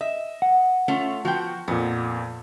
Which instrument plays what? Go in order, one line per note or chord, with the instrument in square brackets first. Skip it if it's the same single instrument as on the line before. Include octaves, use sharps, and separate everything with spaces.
[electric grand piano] D#5 [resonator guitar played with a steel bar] E5
[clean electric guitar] F#5
[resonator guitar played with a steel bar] A3 C#4 F4
[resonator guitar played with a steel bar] F3 B3 G5 [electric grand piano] F#4
[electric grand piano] F2 A#2 [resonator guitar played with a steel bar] B3